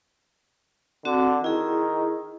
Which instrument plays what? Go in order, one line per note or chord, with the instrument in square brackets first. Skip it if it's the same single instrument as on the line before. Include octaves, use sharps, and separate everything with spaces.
[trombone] D3 [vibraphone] C4 F#4
[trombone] D#3 [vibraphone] E4 G#4